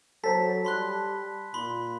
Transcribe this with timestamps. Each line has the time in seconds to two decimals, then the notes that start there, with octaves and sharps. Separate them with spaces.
0.24 F#3 A4 C5 A5 A#5 B6
0.65 G3 B5 C6 F#6
1.54 A#2 B5 C6